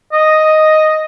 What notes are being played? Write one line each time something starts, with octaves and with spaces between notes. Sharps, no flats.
D#5